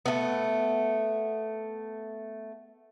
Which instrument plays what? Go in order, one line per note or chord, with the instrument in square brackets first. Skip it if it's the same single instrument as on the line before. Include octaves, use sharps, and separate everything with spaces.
[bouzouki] A3 B3